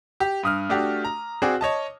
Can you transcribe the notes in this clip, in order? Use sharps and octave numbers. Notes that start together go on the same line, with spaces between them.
G4
G2 D#6 F6
A3 D4 F#4 G4
A#5
C4 F#4 G#4 D5
C#5 D#5 A5